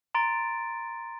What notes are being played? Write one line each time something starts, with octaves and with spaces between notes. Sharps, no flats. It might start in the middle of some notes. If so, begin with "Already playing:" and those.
A#5 C6 A6 D7